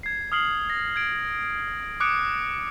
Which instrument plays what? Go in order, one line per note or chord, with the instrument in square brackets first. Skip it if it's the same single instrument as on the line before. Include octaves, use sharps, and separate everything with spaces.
[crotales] G#6 C7
D#6 F6 C7 F#7
A#6
G#6 D7
D6 D#6 F#6 C#7 D7